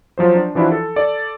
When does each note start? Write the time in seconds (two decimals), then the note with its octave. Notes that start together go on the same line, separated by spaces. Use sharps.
0.18 F3 F#3 C5
0.35 D4
0.55 E3 F3 D4 E4 F#4
0.72 A4
0.96 A4 D5